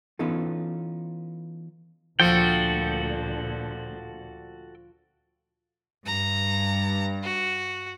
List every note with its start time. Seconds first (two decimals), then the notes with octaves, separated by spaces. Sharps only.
0.19 E3 B3 C#4 D#4 F4 A4
2.20 D2 A#2 D3 F3 F#4 A4 G5
6.06 G2 A#5
7.23 F#4